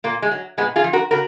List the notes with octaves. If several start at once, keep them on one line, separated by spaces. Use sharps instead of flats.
A#2 A#3
G#3
F#3
A#2 G#3 B3
F4 G#4
F3
F#4 A#4
C#3 F#4 A#4